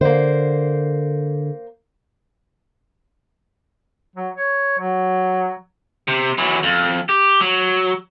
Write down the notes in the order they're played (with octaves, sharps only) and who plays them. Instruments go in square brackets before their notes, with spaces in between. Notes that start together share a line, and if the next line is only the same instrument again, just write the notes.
[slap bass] D3 [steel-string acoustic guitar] A#3 C5
[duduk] F#3
C#5
F#3
[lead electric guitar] C3
E3 F#3
F2
G4
F#3